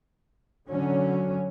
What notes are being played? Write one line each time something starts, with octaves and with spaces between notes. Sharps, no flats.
D3 F#3 C#4